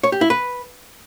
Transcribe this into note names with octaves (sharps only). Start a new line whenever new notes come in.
C#5
G4
E4
B4